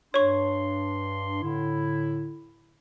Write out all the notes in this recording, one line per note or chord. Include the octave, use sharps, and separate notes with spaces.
G2 D4 C#5 C6 C#6
A2 D3 E4